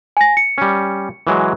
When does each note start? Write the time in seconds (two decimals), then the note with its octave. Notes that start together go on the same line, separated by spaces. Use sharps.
0.17 G#5 A#6
0.37 C#7
0.58 G3 C#4
1.27 E3 F#3 G#3